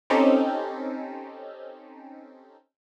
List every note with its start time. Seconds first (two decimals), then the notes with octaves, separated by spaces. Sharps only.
0.10 C4 C#4 D#4 G4 A4